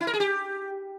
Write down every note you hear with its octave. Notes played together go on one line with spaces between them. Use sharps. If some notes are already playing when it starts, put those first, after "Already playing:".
E4
A#4
G#4
G4